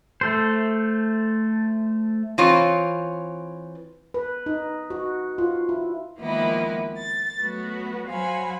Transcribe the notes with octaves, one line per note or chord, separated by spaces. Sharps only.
A3 A4 C5
E3 C4 F4 C#5
B4
D#4
F#4
F4
E4
D#3 F3 G#3 A#3 B3 E4
A6
F#3 A3 B3 F#4
F#3 C5 F5 F#5 G#5 B5